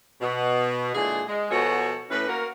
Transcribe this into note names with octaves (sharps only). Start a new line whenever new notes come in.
B2
A#2 D3 E3 G#3 G#4
G#3
B2 F3 F#4 G#4 A4 C#5
A2 E3 C#4 B4
A#3 F#4 A#4